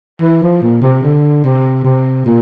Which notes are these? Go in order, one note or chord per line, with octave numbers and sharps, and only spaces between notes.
E3
F3
A#2
C3
D3
C3
C3
A#2